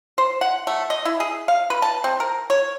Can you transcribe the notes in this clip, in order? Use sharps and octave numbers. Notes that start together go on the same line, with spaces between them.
C5
F#5
A3
D#5
E4
G#4
F5
B4
A5
C4
A#4
C#5